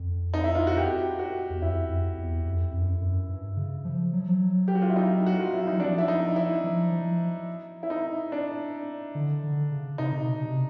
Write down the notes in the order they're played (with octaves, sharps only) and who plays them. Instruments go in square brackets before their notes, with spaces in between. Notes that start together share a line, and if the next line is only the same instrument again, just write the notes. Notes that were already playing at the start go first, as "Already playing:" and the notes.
Already playing: [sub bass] F2
[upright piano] D#4
E4
F4
F#4
G4
F#4
[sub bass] E2
[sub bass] F2 [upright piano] E4
[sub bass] F2
E2
F2
F2
F#2
F2
F#2
G2
C#3
F3
F#3
F3
F#3
[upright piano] G4
F#4
F4
E4
D#4
F#4
F4
E4
[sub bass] F#3 [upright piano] D#4
[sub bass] F3 [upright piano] D4
[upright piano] E4
D#4
E4
[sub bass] F3
F3
[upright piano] E4
D#4
D4
[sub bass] D3
D3
C#3
[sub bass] C3 [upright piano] D#4
[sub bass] C3
B2
C3